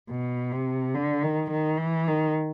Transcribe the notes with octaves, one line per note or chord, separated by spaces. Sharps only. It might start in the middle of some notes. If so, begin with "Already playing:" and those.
B2
C3
D3
D#3
D#3
E3
D#3